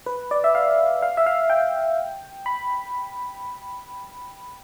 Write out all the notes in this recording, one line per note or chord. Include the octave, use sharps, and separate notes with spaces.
B4
D5
E5
F5
F5
E5
F5
G5
B5